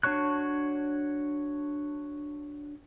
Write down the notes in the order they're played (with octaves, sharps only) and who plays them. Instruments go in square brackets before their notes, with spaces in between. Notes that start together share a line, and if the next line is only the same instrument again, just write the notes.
[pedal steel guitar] D4 F#4 C#5 C#6 F#6